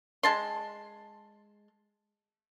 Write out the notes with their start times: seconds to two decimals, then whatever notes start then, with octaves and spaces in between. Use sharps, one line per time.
0.23 G#3 A5 C6